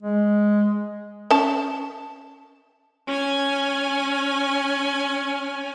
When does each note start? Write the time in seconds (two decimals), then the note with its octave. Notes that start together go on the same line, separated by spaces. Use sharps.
0.03 G#3
1.31 C#4 A5
3.07 C#4 G#5